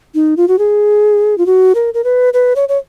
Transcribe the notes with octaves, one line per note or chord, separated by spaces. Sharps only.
D#4
F4
F#4
G#4
F4
F#4
A#4
A#4
B4
B4
C#5
C#5